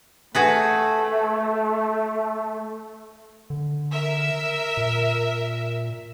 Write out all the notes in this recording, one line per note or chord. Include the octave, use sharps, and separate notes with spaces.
A3 F#4 G#4 B4
D3
A#4 E5
A#2